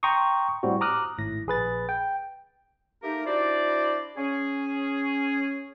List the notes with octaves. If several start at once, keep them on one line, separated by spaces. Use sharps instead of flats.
G5 A#5 C6 C#6 D#6
A2 G3 C4 F#4
A#5 D6 D#6 F6 F#6
G#1 A2 A#6
A#1 G#4 B4 A6
G5
A3 A#3 D#4 G4 A#4
D4 E4 F#4 C5 D5
C#4 G#4